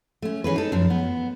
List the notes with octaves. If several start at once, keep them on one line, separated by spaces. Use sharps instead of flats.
A3 C#4
E3 C#4 G#4 B4
D#4 A4
F#2 F3
B3